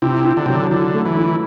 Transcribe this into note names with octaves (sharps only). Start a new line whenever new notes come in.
C3 E4
E4
D3
C3 F#3
D3
D3 E4
A3
E3
E4